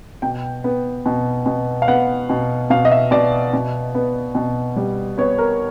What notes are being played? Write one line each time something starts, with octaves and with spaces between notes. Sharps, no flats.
B2 G5
B3
B2
B2
F5
B3 F#5
B2
B2 F5
D#5
E5
B2 D5
B2
B3
B2
G3
B3 C#5
A#4